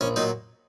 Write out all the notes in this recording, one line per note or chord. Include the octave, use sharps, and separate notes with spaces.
A#1 C#4
A#2 F#3 D#4